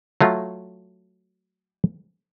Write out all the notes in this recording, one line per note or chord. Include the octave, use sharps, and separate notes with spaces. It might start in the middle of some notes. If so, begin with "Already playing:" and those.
F#3 A3 F4